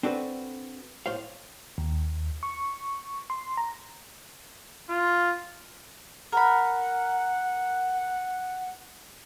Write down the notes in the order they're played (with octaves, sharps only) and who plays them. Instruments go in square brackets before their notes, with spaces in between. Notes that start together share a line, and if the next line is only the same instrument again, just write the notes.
[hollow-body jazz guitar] C4 D4 F#4 A4 B4 C5
B1 A2 C5 C#5 F5
[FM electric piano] D#2
C#6
C6
A#5
[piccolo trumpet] F4
[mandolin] A#4 B5 [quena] F#5